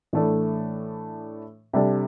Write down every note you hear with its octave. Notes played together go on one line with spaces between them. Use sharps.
A2 E3 A3 D4 A4
C3 G3 D4 A4